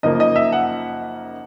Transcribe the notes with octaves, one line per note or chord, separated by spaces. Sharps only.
F#2 C#3 F3 A#3 D#4 D#5
D#5
E5
F#5